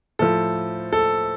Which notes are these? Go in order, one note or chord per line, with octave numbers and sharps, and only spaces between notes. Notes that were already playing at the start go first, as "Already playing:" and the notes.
A2 F3 A4
A4